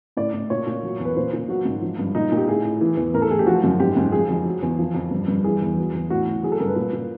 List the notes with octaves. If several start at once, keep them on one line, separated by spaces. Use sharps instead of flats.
A2 D5
A2
A#2 C#5
A#2
F#3
E2
B4
A#2 C5
A#2
F#3 F#4
G#2
F3
G2
A#2 D#4
A#2
G4
A2 G#4
A2
E3
E2
A2 A#4
A4
A2 G#4
G4
F3 F#4
F#2
G#2 G4
G#2
F3 G#4
F2
F#3
E2
F3
F2
G2
G2
E3 G#4
E2
F#3
E2
A2 F#4
A2
F#3 G#4
A4
G2 A#4
B4
A#2
A#2